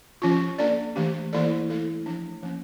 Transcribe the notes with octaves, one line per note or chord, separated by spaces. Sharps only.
F3 C#4 F4
A#3 D4 A4 D5
E3 A3 D4 G4
E3 A#3 E4 A4 D5
A3 E4 A4
F3 A3 D4
F3 A#3 C#4